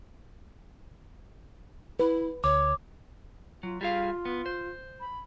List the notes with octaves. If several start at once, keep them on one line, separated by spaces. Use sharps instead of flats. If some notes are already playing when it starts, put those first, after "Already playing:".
E4 B4
D2 C#5 D6
F#3 F4
G3 F4 G#4 F5
B3
C5
B5